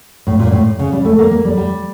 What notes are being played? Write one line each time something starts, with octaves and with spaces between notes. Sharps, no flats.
A2
A#2
A2
C#3
G3
A3
A#3
A#3
G3
G3